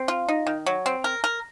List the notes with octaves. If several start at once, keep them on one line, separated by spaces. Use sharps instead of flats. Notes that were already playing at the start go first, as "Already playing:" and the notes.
Already playing: C4
F4
D#4
D#3
F#3
C4
A#4
A#4